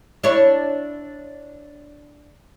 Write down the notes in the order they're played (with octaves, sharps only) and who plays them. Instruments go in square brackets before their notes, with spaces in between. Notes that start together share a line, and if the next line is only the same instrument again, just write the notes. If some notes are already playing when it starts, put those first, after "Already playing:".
[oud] D4 E4 C#5